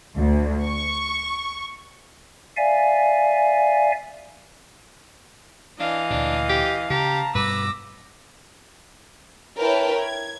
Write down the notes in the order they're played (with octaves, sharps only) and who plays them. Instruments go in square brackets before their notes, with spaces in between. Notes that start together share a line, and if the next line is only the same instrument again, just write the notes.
[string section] D2
C#6
[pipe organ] D5 E5 F5 G#5
[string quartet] E3 D#5 [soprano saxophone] D4 [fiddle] F5
[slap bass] D2 A#2 [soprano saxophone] D4
[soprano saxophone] G4
[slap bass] C#3 [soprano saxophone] G4 [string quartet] A5 A#5
[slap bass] G2 B2 G3 [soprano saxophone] B4 [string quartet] D6 E6 A#6
[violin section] E4 A#4 B4 C#5 G5 A5
G#6